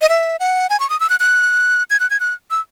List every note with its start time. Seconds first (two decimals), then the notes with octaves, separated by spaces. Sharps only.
0.02 D#5
0.09 E5
0.40 F#5
0.70 G#5
0.80 C#6
0.90 D#6
1.00 E6
1.10 F#6
1.20 F#6
1.90 G#6
2.00 F#6
2.10 G#6
2.20 F#6
2.51 E6